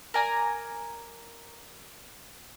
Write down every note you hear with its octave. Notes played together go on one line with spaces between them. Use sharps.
A#4 D5 G#5 A#5